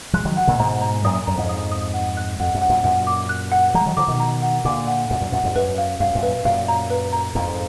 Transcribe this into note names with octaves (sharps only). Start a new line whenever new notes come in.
F3 G#3 F#6
D#3 F#3
F#5
A#2 D3
G#2 B2 A#5
A#5
F#2 A#2 D#6
F#2 A#5
F2 G#2
D#6
D#6
F#5
F#6
F2 F#5
F#2
F#5
F#2 A#2
F#2 A#2 F#5
D6
F#6
F#5
F3 G#3 A#5
D#3 F#3
D3 F3 D6
B2 D#3
A#5
F#5
A#2 D3 D6
F#5
F#2 A#2 F#5
F#2 A#2
F#2 A#2 F#5
F2 G#2
F#2 B4
F5
F#2 F5
F#2 A#2
B4
F#2 A#2 F5
A#5
B4
A#5
F2 G#2 A#5